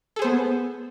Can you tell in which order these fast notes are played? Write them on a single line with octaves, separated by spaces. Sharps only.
A4 G#4 C5 B3